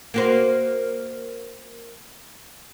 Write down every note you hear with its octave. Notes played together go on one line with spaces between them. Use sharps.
A#3 F#4 C5